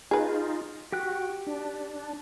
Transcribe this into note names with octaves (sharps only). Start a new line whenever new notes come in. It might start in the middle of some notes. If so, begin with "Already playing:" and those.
D#4 F4 G#4 B4
F#4 G4 G5 F#6
D4